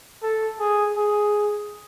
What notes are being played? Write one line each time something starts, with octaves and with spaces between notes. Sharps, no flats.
A4
G#4
G#4